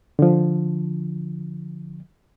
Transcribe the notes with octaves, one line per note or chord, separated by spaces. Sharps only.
D3 F3